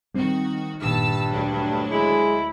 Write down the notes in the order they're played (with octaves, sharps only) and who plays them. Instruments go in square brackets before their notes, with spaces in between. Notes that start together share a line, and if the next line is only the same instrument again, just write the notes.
[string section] D#3 F#4 [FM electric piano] G3 C4
[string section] G1 A5 E6 [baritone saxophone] G2 [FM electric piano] A#2 D#3
[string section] D2 F#3 D4
[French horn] G#3 [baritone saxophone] E4